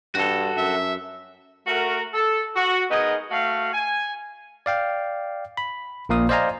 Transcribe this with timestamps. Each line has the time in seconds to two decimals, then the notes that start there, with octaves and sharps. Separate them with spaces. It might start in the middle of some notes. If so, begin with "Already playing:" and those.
0.15 G2 F#4 A4
0.57 F#2 E5
1.67 A3 F#4 A#4
2.14 A4
2.56 F#4
2.91 G#3 B3 D#4 G#4 A#4 D#5
3.31 A3 F#4 F5
3.73 G#5
4.66 D5 F5 G5
5.57 B5
6.09 A#1 A#2 F5 D#6
6.29 C5 D5 D#5 F5 G#5 A#5